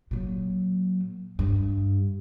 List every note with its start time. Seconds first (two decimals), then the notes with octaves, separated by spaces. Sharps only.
0.11 A#2 F#3
1.39 G2